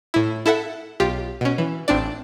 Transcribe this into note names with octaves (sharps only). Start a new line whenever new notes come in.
A2 E4
E4 A4 E5 F#5
B1 F4 G4
B2 C#4
E3
A1 C4 D4 D5